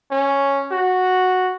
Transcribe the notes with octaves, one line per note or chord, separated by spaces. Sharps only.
C#4
F#4